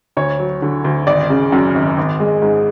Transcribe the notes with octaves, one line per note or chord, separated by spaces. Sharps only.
D2 C#5
F#3
D3
D2
G#1 D5
C#3
F#2
G#1
G#1
G#3
G#2